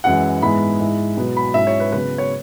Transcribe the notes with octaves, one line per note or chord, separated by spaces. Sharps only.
F#2 E3 G#3 E4 F#5
G#2 G#3 B3 E4 B5
G#2 G#3 E4
B2 F#3 B3
B5
G#2 F#3 C#4 E4 E5
C#5
B4
C#3 F#3 B3 B4
C#5